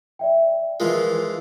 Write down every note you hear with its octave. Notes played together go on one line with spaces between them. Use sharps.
D5 E5 G5
E3 F3 G#3 F4 A#4